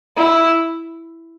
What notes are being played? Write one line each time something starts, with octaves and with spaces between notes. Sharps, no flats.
E4